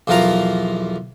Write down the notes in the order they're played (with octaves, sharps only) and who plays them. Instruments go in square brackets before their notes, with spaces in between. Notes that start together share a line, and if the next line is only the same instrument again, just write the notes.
[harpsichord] B1 E2 F3 F4 A#4 A#5